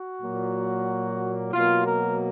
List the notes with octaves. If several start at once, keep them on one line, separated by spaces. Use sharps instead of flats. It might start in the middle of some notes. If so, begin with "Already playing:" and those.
Already playing: F#4
A#2 F#3 A#3
B2 F#3 A#3 F4
A#4